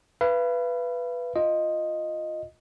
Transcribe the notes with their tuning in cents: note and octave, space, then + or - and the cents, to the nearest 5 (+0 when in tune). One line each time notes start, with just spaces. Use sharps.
B4 +0 F5 -45
F4 +0 D#5 +0